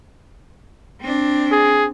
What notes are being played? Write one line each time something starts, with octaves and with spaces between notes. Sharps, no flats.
C4 D4
G#4